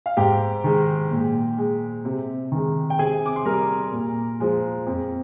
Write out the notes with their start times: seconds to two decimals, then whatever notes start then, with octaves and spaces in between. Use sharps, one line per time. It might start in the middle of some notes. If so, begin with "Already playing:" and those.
0.06 F5
0.17 G#2 G4 G5
0.64 D#3 G#3
1.11 A#2
1.58 G#3
2.05 C3
2.52 D#3 G#3
2.90 G5
2.99 C3 G#4 G#5
3.26 D6
3.36 C6
3.45 G3 A#4 A#5
3.93 A#2
4.40 F3 G#3
4.86 F2